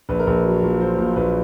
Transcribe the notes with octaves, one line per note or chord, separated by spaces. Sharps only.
A#1 B4
A#4
A#1 B4
F#3
A#2
F#3 C5
A#2
A#1 B4